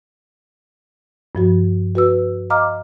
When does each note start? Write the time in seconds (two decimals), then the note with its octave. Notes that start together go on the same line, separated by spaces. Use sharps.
1.35 G2 F3 F#4
1.95 F#4 B4 E6
2.50 D#5 F5 A#5 D6 F6